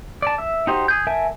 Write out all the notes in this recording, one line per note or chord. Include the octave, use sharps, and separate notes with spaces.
D5 A5
E5
D#4 F#4 G4 C5
G#4 G6
A#4 E5 G#5 A5